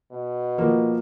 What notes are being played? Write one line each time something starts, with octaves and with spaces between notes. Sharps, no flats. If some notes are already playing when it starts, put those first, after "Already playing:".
B2
F3 A#3